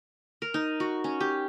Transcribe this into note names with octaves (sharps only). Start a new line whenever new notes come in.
A#4
D#4
F#4
C#4
G4